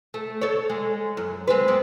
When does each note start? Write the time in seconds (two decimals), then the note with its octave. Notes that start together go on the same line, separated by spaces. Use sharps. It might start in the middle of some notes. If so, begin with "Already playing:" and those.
0.14 A3
0.41 A4 C#5
0.70 G#3
1.17 F#2
1.47 G#3 C4 B4
1.68 F#2 B3 C4